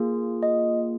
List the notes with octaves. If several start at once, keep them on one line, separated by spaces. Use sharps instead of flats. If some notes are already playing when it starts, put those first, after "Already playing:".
Already playing: A#3 F4 G#4
D#5